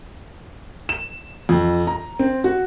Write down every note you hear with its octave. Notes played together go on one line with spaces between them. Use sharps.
E7
F2
A#5
C4
F#4